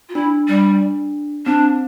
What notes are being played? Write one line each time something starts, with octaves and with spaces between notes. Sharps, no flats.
F4
D4 E4
G3
C4 D4